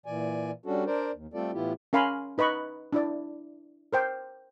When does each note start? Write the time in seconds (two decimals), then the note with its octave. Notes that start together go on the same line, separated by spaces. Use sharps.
0.06 A#2 E3 D5 G#5
0.66 G3 C#4 D4 F#4 A4
0.86 D4 A#4 C5 D5
1.13 D#2
1.34 G3 A3 C4 F4 A4 D5
1.53 A2 E3 B3 E4 F4 G4
1.93 C#4 A#4 F5 G#5 B5 C6
2.38 D#4 B4 D#5 B5 C#6
2.93 D4 E4 D5
3.93 A#4 C5 G5